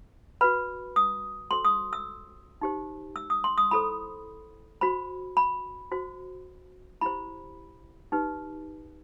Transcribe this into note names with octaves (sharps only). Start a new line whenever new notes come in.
F#4 B4 B5
D#6
F#4 A4 C5 C6
D#6
E6
D#4 G4 C5
E6
D#6
C6
D#6
E4 A4 C5 B5
F#4 C5 B5
B5
F#4 C5
E4 G4 C5 B5
D#4 G4 B4